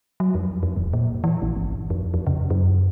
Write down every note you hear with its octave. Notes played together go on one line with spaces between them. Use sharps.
F#3
F2
F2
D1
A#2
E3
A#1
G1
F2
F2
C#3
F#2